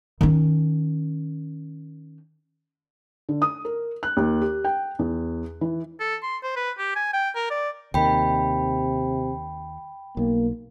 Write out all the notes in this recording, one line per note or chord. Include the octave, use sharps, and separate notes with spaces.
D#3 C#4
D3
D#6
A#4
F#6
D#2
G4
G5
E2
E3
A4
C6
C5
B4
G4
G#5
G5
A#4
D5
D#2 C3 D#3 G5 B5
B1 A#3